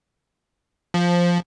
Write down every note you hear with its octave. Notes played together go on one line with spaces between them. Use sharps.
F3